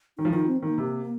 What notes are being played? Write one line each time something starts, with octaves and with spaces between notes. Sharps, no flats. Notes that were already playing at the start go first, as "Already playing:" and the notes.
D#3 D#4
F3
D#3 F4
C4
D#3 A#3
C3